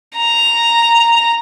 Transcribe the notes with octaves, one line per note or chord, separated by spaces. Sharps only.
A#5